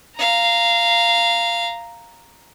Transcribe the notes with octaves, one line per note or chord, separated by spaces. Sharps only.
F5 A#5